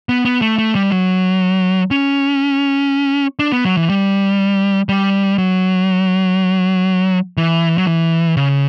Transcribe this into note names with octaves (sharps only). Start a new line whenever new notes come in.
B3
B3
A3
A3
G3
F#3
C#4
D4
B3
F#3
E3
G3
G3
F#3
E3
F#3
E3
C#3